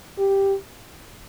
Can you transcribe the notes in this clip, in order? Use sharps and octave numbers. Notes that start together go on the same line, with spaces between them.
G4